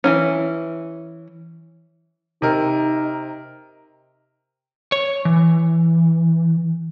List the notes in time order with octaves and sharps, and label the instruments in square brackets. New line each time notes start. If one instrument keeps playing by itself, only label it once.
[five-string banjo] E3 F#3 C#4
[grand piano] C3 A#4 [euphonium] D#4
[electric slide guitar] C#5
E3